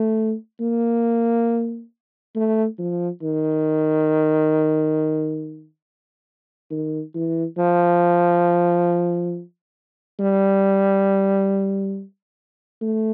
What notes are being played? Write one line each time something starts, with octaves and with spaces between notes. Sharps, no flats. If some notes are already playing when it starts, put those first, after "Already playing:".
Already playing: A3
A#3
A3
F3
D#3
D#3
E3
F3
G3
A3